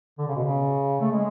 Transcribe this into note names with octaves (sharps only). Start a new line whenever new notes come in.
D3
C#3
B2
C#3
A3
G#3